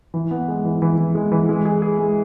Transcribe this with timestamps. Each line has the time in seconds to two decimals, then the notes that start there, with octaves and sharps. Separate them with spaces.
0.14 E3
0.31 B3
0.48 G#3
0.65 E3
0.82 E3
0.98 E3
1.15 G#3
1.32 E3
1.49 G#3
1.65 G#4
1.82 G#4
1.98 G#3